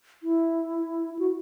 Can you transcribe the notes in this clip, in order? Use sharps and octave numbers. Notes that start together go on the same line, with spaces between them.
E4
F#4